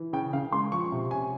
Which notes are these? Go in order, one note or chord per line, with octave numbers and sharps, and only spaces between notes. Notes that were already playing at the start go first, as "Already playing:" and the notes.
Already playing: E3
C#3 G5
C#3 F5
G#3 C6
F3 C#6
C3
C#4 G#5